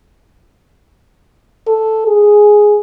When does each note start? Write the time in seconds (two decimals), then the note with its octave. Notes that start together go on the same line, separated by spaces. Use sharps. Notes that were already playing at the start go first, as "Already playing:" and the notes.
1.67 A4
2.07 G#4